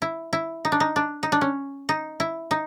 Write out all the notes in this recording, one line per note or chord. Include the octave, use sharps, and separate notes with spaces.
E4
E4
D#4
D4
D#4
D4
D#4
D4
C#4
D#4
E4
D#4